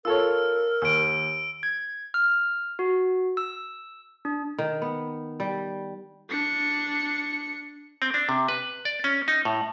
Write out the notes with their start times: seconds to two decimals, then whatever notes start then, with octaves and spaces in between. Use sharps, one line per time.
0.05 F4 A4 A#4 C#5 E6
0.82 D#2 E6 D7
1.63 G#6
2.14 F6
2.79 F#4
3.37 E6
4.25 D4
4.58 D#3
4.82 B3
5.40 G3
6.29 D4 C#7
8.02 C4
8.14 D4
8.29 C3
8.48 B4
8.85 D5
9.04 C#4
9.28 D#4
9.45 A2